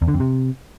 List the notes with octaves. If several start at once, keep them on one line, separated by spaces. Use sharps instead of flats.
E2
D3
F2
C3